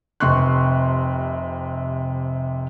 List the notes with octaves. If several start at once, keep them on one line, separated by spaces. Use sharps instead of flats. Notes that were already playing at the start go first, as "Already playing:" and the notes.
F1 C3 C6 C#6 F#6